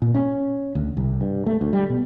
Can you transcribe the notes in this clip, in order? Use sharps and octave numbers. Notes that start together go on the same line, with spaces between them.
A#2
C#4
D2
C2
G2
A3
D2
G3
B2